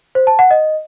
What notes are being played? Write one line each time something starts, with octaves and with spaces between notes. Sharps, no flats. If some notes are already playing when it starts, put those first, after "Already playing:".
C5
A5
F#5
D#5